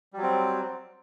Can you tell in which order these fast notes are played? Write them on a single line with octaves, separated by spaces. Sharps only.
G3 F#3 C4